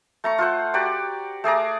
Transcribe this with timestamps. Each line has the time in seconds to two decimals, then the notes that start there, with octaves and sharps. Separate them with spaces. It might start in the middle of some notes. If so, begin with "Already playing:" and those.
0.24 A3 A#5 C#6
0.38 F4 A4 C5 F#5
0.74 F#4 G4 D5 A#5
1.44 A3 G#4 D5 A#5